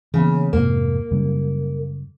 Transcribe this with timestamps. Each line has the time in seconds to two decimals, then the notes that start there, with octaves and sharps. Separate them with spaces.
0.14 C#3 E3 A#3 B3
0.53 F2 G#2 C3 A#3
1.11 F#2 C#3 G3